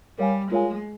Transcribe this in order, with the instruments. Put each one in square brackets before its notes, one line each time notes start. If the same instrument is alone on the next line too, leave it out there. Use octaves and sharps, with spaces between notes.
[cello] G3 [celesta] A#4 C#5 F5 G#5
[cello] G#3 [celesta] F4 A#4 C#5 F5 G#5